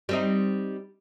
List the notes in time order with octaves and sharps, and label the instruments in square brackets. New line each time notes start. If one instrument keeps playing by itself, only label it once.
[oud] G3 C4 D#4